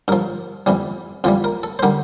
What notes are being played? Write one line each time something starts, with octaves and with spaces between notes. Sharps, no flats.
G2 F3 A#4
F2 E3 G3
F2 E3 G3 F4
A#4
A4
C5
D3 G3 A#4